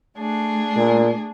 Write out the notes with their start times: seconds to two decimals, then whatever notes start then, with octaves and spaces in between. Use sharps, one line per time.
0.18 A3 D4 G#4
0.76 A#2